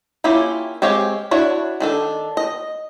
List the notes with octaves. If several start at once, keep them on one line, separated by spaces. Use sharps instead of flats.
A#3 C#4 E4 F4 G4
G#3 C4 G4 C#5 F5
D4 E4 F#4 C#5
D#3 D4 A4
D#5